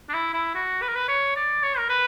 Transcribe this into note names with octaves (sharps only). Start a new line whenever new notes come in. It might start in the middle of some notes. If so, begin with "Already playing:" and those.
D4
E4
E4
F#4
B4
A#4
B4
C#5
D5
C#5
A#4
B4